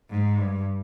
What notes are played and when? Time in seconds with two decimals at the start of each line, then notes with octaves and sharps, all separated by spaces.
0.10 G#2
0.38 G2